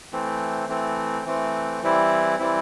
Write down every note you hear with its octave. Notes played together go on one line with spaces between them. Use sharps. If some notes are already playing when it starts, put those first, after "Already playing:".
E3 A3 C4
E3 A3 C4
E3 A3 C4
E3 G3 C4 E4
E3 G3 C4 E4